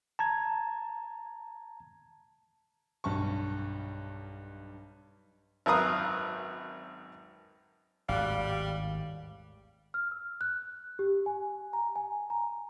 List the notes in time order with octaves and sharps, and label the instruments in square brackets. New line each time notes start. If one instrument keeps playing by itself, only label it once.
[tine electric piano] A5 A#5 G#6
[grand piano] B1 G2 A5 C#6
[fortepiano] G#1 F#2 A#4 B4 F5 D#6
[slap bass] G#1 D#2 A2 [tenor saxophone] G3 [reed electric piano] F5 F#6
[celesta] F6
E6
F#6
G4
G#5
A#5
G#5
A#5